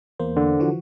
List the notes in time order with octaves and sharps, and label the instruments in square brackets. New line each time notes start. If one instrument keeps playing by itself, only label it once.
[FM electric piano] E2 A#3 C5
[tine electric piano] D3
[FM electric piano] E3 F3 F#4